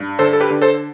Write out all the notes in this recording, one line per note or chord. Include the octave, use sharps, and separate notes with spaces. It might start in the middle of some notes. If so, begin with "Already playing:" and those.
Already playing: G2
D3 A4 C5
A4
G4 B4
D3
A4 C5